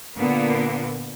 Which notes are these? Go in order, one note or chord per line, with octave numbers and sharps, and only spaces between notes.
A#2 D3 A#3 B3